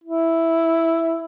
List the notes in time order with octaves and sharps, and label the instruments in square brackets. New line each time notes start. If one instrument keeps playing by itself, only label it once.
[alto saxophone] E4